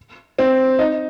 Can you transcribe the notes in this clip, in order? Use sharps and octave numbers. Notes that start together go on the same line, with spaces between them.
C4
D#4